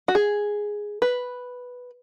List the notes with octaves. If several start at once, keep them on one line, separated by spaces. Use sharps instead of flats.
F#4
G#4
B4